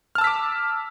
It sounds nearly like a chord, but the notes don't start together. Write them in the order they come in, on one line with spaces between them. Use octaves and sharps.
F6 A5 E6 B6 D6